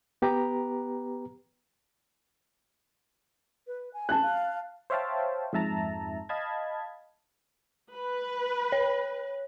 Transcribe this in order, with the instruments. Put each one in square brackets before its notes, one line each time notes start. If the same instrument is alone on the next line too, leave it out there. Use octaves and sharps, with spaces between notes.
[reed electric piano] B3 G4 B4 A#5
[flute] B4
G#5
[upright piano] A5 F#6
[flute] F5
[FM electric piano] C5 C#5 E5 F5 G5 A5
F2 G#2 E5 A5 A#5
D#5 F5 A5 B5 G#6
[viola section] B4
[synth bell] C#5